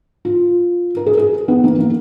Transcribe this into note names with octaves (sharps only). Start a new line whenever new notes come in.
F4
A#4
G#4
G#4
B3
A#3
A#3